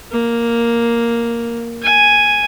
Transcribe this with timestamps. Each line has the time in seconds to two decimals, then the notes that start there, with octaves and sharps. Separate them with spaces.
0.11 A#3
1.82 G#5